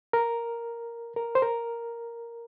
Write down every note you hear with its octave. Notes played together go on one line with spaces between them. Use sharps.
A#4
A#4
C5
A#4